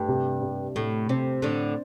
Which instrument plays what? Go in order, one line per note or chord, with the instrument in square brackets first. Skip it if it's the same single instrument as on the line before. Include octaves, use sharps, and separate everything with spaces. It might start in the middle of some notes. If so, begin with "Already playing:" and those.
Already playing: [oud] G2 [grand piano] A3
[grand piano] C3
C3
[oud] A2 [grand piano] A3
[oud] C3 [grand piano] C4
[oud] A2 D3 [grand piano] D4